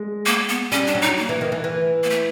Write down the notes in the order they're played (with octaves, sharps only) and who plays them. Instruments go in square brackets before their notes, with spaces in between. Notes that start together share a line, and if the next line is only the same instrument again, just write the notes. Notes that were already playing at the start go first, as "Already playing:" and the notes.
Already playing: [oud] G#3
[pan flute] A#3
B3
[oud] G3 [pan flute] C#4
[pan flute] D4
[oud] F#3
[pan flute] D#4
A#3
[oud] E3
D#3
E3
E3
[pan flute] A#3
A3